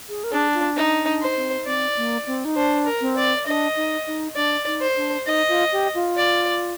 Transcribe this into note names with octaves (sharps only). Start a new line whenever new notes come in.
G#4
A#4
D4 G#4
F4
D#4
D4
C5
C4
C4 D5
A#3
C4
D#4
D4 C5
A#4
C4
D5
D4 D#5
D#4
D#4
D4 D5
D#4
C5
D4
D#4 D#5
F4
G4
F4
D5